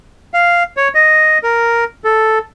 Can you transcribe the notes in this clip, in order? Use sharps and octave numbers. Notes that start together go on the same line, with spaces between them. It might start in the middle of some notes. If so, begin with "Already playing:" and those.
F5
C#5
D#5
A#4
A4